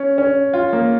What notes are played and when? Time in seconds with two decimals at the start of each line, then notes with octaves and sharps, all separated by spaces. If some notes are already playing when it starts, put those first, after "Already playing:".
Already playing: C#4
0.18 C#4
0.54 F4
0.73 A#3